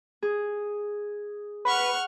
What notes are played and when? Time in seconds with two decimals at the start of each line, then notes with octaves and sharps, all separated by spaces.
0.22 G#4
1.65 B4 F#5 C#6 F6